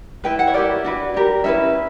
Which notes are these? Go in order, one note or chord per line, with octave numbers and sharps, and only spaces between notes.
E4 B4 G5
F#5
C#5
E4 G4 A#4 D5
D4 F#4 B4
D4 G4 A#4
C#4 E4 B4 E5